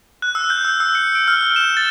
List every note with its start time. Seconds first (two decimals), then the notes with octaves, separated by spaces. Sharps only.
0.22 F#6
0.35 E6
0.50 G6
0.65 E6
0.80 E6
0.95 C#7
1.15 D7
1.28 F6
1.56 E7
1.77 A6